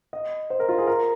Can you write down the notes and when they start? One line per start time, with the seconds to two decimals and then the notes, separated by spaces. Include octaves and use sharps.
0.13 D#5
0.50 C5
0.60 A#4
0.69 F4
0.78 G#4
0.87 A#4